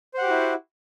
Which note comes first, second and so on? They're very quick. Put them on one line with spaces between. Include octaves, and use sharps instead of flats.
C5 F#5 G4 F#4 E4